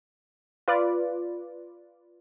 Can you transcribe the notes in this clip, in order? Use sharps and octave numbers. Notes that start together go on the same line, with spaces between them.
F4 B4 D5